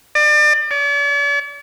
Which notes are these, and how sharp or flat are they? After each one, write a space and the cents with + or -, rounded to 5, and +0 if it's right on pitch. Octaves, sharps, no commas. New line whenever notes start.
D5 +35
D5 -45